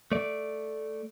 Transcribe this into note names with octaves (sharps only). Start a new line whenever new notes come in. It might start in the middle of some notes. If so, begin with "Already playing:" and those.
A3 D5